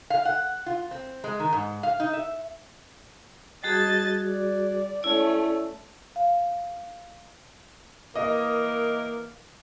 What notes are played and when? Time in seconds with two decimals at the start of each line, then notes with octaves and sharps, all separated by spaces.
0.10 F5
0.25 F#5
0.66 F4
0.91 C4
1.24 G#3
1.40 D#3
1.53 G#2
1.83 F5
2.00 D#4
2.13 E5
3.64 G3 F#4 G#4 D#5 A5 A6
4.28 D5
5.03 A3 C#4 E4 D5
6.16 F5
8.16 E3 A#3 A#4 D#5